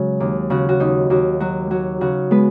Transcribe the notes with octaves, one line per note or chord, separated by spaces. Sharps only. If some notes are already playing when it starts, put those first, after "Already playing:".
Already playing: C#3 F#3 G#3 F#4
D#2
C#3 F#4
F#4
D#2 D#4
D#2 F#4
F#3 F#4
F#3 F#4
C#3 F#4
G#3 B3 B4